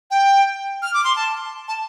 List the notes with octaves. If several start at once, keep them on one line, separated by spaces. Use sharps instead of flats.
G5
F6
D6
C6
A5
A5